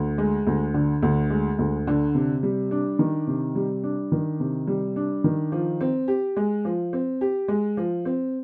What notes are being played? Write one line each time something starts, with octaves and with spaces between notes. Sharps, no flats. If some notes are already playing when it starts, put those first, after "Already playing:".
Already playing: D2
G#3
D2
D3
D2
G#3
D2
D3
C3
G3
D4
D#3
C3
G3
D4
D#3
C3
G3
D4
D#3
F3
C4
G4
G#3
F3
C4
G4
G#3
F3
C4